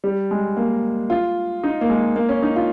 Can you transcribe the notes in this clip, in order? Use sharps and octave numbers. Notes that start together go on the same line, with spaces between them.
G3
G#3
A#3
F4
D#4
A#3
G#3
A#3
C#4
D#4
F4